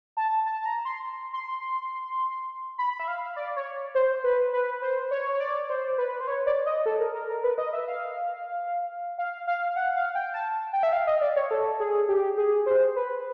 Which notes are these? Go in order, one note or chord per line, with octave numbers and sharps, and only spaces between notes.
A5
A5
A5
A#5
C6
C6
B5
E5
F5
D5
C#5
C5
B4
B4
C5
C#5
C#5
D5
C5
B4
C5
C#5
D5
D#5
A4
A#4
A#4
A#4
B4
D#5
E5
F5
F5
F5
F#5
F5
G5
A5
G5
E5
F5
D#5
D5
C#5
A4
G#4
G4
G#4
C5
B4